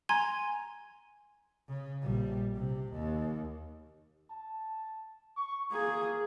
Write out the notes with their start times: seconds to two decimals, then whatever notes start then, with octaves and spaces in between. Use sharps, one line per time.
0.09 G#5 A#5 C6 G#6
1.68 C#3
2.03 A#1 G3
2.56 C3
2.93 D#2
4.30 A5
5.36 C#6
5.72 A#3 G#4